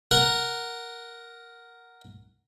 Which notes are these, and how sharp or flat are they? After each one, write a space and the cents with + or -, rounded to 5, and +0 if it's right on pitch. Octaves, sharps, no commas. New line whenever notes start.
A#4 +0 F#5 +0